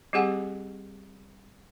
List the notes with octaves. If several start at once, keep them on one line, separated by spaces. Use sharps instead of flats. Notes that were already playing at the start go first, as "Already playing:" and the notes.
G3 C4 G4 G#4 F#5 G#5